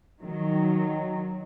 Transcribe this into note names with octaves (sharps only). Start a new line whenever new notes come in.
D#3 F#3